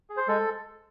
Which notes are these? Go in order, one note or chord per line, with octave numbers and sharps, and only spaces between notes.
G#4
C5
G#3 A4